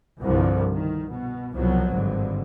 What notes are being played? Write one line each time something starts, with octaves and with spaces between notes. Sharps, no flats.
C2 G2 D3 F3
D#3
B2
C2 B2 F3 F#3
G#1 G2 D3